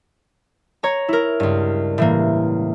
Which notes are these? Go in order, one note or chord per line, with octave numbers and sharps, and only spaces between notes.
C#5 A#5
E4 A#4
C#2 G2
A2 E3 A#3